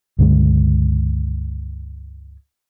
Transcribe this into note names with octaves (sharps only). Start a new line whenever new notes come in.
C#2 G2 D3 G#3